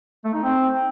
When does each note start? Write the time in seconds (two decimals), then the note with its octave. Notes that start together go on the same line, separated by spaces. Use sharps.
0.25 A3
0.34 D#4
0.43 C4